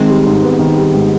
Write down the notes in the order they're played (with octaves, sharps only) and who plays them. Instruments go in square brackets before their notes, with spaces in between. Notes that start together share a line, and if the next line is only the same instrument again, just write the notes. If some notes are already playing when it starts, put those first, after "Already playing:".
Already playing: [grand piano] D#3 [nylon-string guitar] G#3 C4
[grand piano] G3
G#2
B3
D#3
G3
G#2